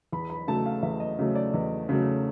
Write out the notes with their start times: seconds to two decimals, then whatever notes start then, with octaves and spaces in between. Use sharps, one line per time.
0.12 E2 B5
0.30 B5
0.47 C#3 F#3 A3 A5
0.66 F5
0.83 E2 E5
1.00 D#5
1.19 C#3 F#3 A3
1.35 D5
1.53 E2 D#5
1.89 C#3 F#3 A3